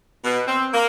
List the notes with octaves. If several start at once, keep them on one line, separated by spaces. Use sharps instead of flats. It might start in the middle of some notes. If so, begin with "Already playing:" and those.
B2
C4
A#3